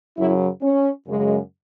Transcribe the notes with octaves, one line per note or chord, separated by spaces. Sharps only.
F#2 C#3 F#3 E4
C#4
F#2 C#3 G#3